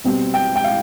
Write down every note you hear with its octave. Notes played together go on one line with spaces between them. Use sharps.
B2 G3 C4
G5
G5
F5